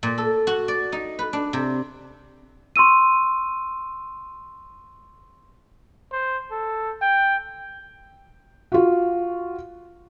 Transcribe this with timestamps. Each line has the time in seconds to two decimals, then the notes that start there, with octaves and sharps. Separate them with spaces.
0.03 A#2
0.18 A4
0.47 F#4
0.68 D5
0.92 D#4
1.19 B4
1.33 D4
1.53 C3
2.76 C6 C#6 E6 D#7
6.12 C5
6.51 A4
7.02 G5
8.72 F4 F#4